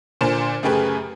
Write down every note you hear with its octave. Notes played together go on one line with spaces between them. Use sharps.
A#2 D3 C5 G#5 E7
F#2 C#3 A3 G4 G#4 B4